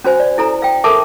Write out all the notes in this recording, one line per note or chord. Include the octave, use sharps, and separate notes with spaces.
C#4 F#4 C5 G#5
D5
E4 A4 A#5
F5 G5
A4 A#4 E5 A5 D6